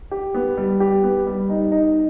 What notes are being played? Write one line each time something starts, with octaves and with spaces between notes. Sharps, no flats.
G4
B3
G3
G4
B3
G3
D#4
D#4